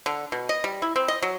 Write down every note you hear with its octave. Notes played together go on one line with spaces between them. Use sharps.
D3
B2
D#5
G3
E4
C4
D#5
F#3